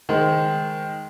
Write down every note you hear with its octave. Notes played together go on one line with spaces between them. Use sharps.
D#3 G#3 C5